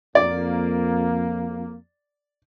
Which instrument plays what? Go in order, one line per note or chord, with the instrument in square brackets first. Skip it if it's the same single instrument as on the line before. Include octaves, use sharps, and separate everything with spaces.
[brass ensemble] F2 A#3 [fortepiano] D5